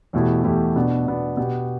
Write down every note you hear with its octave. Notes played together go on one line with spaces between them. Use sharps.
E2 B2 A3 E4 G4
E2 B2 A3 E4 G4
B2 B3 D4
B2 B3 D4
B2 B3 G4